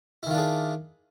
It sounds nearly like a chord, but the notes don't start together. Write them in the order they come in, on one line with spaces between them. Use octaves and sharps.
E4 D#3 F4 D4 G#4